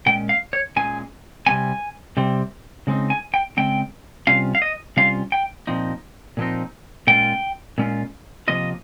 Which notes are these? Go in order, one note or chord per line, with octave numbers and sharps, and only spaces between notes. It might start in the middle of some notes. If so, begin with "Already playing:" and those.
A#2 G#3 C#4 G5
F5
C#5
A#2 G#3 C#4 G#5
C3 G3 C4 G#5
C3 G3 C4
C#3 G#3 C4 D#4
G#5
G5
C#3 G#3 C4 G5
C3 G3 C#4 F4 F5
F5
D#5
C3 G3 C#4 F4 F5
G5
A#2 F3 C4 D#4
A#2 F3 C4 D#4
A#2 G#3 C#4 F4 G5
A#2 G#3 C#4 F4
C3 F3 A#3 F4 D#5